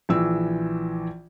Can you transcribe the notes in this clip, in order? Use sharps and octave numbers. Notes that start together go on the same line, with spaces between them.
A#1 E3 E6